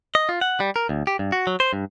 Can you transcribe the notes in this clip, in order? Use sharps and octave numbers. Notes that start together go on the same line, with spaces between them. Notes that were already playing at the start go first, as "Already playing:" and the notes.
D#5
F4
F#5
G3
A#4
D2
G4
G2
F#4
F#3
C5
G2